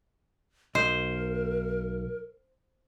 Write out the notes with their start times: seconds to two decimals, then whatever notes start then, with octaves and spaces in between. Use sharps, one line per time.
0.75 B1 A#4 C5 D#5